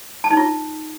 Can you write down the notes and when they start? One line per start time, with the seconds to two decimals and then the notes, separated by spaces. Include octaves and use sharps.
0.24 A5
0.31 D#4
0.37 F4